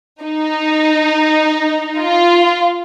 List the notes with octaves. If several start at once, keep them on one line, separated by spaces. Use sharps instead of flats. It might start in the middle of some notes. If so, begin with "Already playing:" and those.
D#4
F4